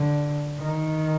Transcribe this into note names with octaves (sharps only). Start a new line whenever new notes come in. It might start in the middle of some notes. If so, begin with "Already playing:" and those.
Already playing: D3
D#3